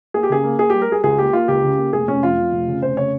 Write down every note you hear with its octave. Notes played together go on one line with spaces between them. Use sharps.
A#3 G#4
G4
C#3 G#4
A#3
A#3 G#4
G3 G4
A#4
G3 G#4
C#2 G#4
A#3 G4
A#3 F4
C#2 G4
C#3
A#3
F1 G#4
F1 C#4
F2 F4
F2
F1
C#3
F1 C5
C#3 C#5